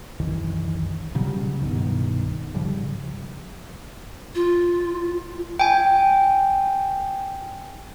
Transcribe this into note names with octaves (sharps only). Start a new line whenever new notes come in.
C2 F#2 D#3 E3
A#2 C#3 F#3 G3
C2 G2 B2 D#3
G#2 C#3 F3 G3
F4
G5 G#5